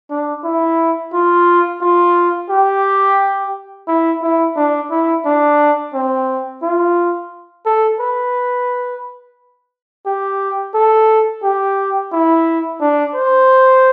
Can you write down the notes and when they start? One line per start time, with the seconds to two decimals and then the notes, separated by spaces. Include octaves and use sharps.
0.10 D4
0.44 E4
1.13 F4
1.82 F4
2.50 G4
3.88 E4
4.22 E4
4.56 D4
4.91 E4
5.25 D4
5.94 C4
6.63 F4
7.66 A4
8.00 B4
10.06 G4
10.74 A4
11.43 G4
12.12 E4
12.80 D4
13.14 C5